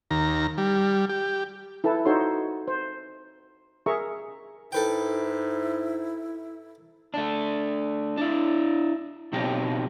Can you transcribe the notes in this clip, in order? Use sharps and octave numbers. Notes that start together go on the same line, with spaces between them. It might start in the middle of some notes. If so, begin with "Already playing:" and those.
D#2 A#5
G3
G4
E4 A4 B4 A5
D#4 F#4 A4 C5 C#5 C6
C5
G#4 A#4 E5 A#5 C#6
G#2 E4 A4 B4 G5
A3 D4
D4 E4
B2 F#3 C4 D#4 G4